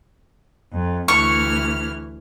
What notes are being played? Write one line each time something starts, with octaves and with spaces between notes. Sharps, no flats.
F2
D2 E3 C#6 F6